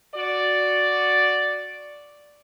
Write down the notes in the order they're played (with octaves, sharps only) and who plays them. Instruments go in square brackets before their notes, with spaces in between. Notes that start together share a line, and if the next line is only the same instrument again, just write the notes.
[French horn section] F#4 D5